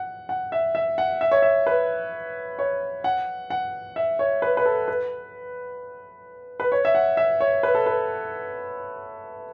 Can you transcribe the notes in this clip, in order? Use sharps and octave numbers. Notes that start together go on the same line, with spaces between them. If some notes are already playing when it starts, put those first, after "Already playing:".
Already playing: F#5
F#5
E5
E5
F#5
E5
C#5
E5
B4
C#5
F#5
F#5
E5
C#5
B4
B4
A4
B4
B4
C#5
E5
F#5
E5
C#5
B4
A4
B4